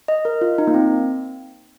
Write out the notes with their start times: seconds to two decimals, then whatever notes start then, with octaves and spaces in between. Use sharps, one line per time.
0.08 D#5
0.25 A#4
0.41 F4
0.58 D#4
0.67 A#3
0.74 C4